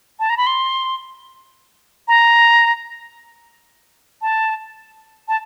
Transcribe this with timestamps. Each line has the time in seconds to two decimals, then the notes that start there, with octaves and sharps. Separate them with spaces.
0.20 A5
0.30 A#5
0.37 B5
0.47 C6
2.08 A#5
4.22 A5
5.28 A5